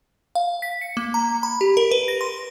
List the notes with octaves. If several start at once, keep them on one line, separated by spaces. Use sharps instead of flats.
F5
B6
C#7
A#3
A#5
B5
G4
A#4
B4
A#6
C6